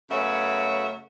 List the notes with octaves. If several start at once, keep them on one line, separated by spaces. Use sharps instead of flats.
F#2 C#3 A3 B3 C#5 E5